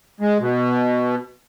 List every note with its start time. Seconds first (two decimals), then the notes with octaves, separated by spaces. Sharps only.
0.20 G#3
0.40 B2